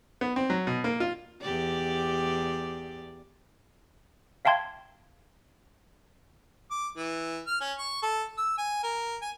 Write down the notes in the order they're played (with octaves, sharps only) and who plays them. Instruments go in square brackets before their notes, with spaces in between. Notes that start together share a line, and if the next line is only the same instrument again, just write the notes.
[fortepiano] B3
C4
F#3
B2
A#3
F4
[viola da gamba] E2 G4 D5
[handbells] E5 F5 G5 A5 C6 G#6
[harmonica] D6
E3
F6
C#4
C#6
A4
E6
G#5
A#4
G#5